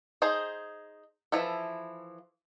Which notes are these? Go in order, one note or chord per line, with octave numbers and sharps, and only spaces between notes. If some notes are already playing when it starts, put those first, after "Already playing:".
D#4 G#4 C5
E3 F3 E4 A4